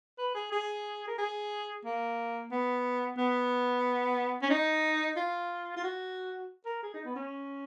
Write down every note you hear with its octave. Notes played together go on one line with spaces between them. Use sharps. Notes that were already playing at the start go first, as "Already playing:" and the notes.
B4
G#4
G#4
A#4
G#4
A#3
B3
B3
C#4
D#4
F4
F4
F#4
A#4
G#4
D#4
B3
C#4